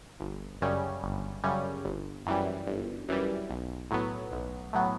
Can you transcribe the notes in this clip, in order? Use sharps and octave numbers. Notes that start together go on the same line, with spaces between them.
G1
F#2 C#3 G3 C#4
G1
F#2 C#3 G3 C#4
G1
F#2 E3 G3
G1
F#2 E3 G3
B1
A2 F#3 B3
B1
A2 F#3 B3